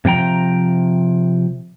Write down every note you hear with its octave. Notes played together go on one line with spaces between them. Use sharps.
C3 F3 G5 A#5